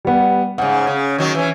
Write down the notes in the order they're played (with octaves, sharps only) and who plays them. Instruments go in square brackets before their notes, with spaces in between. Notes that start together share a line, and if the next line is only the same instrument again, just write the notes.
[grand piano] G3 B3
[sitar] G#2 C#3 [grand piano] F#5
[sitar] C#3
D#3 F#3
E3 C#4